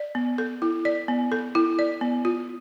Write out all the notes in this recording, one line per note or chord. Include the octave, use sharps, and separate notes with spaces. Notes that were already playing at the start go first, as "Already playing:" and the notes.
Already playing: D5
B3
A4
E4
D5
B3
A4
E4
D5
B3
F4